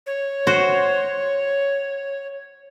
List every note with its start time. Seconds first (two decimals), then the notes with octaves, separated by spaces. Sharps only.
0.07 C#5
0.47 F#4 C5